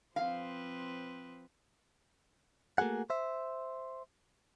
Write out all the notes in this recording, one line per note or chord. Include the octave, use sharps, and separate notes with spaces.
F3 C4 B4 F5
A3 A#3 F#4 G#4 F#5
C5 E5